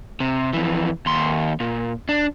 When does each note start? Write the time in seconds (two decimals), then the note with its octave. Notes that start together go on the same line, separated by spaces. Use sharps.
0.20 C3
0.53 F2 E3
1.06 D#2 C6
1.60 A#2
2.09 D4